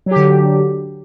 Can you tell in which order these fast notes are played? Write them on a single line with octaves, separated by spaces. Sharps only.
F#3 G4 D3